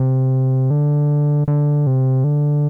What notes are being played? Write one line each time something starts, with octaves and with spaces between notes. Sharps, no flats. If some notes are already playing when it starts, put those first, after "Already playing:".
Already playing: C3
D3
D3
C3
D3